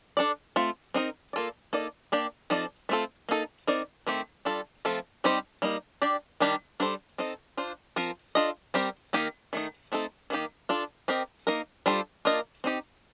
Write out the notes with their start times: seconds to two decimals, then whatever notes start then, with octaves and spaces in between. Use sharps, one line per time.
0.17 D4 A4 D5
0.56 A3 C4 F4
0.94 C4 D#4 A#4 D#5
1.33 A#3 F4 A4 D5
1.73 A#3 D#4 A4 D5
2.12 A#3 D4 G4 D5
2.50 F3 C4 D#4 A4 D5
2.89 A3 C4 F4 A4
3.29 A#3 D#4 A4
3.67 C4 D#4 A#4 D5
4.07 D#3 A3 C4 G4
4.45 G3 D4 F4 A4
4.85 F3 A3 C4 F4 A4
5.24 G3 C4 D#4 G4 C5
5.62 G3 A#3 D#4
6.02 D4 G4 D5
6.40 D#3 G3 D4 G4 A#4
6.80 G3 D4 A4 C5
7.18 C4 D#4 A4 D#5
7.57 D4 F4 C5
7.96 F3 C4 F4 A#4
8.35 D4 F4 A4 D#5
8.74 G3 C4 G4 A#4
9.13 D#3 A#3 D#4 G4 A#4
9.53 D#3 A3 D#4
9.92 A3 C4 D#4 A4
10.30 D#3 A#3 D#4 G4
10.69 D4 F4 A4
11.08 C4 G4 A#4 D#5
11.47 A#3 D#4 A#4
11.86 G3 D4 F4 A4 C5
12.25 A#3 D4 F4 A#4 D#5
12.64 C4 D#4 G4